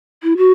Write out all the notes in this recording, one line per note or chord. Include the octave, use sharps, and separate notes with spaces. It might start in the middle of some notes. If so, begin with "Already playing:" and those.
E4
F#4